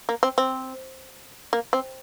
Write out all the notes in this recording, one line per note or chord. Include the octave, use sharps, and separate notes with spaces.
A#3
C4
C4
A#3
C4